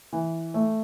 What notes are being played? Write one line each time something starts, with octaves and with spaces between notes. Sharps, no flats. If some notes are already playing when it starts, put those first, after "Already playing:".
E3
A3